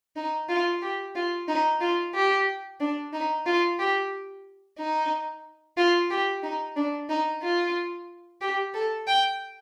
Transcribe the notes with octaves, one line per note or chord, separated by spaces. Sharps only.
D#4
F4
G4
F4
D#4
F4
G4
D4
D#4
F4
G4
D#4
F4
G4
D#4
D4
D#4
F4
G4
A4
G5